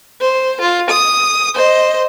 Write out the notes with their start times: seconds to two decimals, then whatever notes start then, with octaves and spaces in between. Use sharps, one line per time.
0.21 C5
0.61 F4
0.91 D#6
1.55 C5 D#5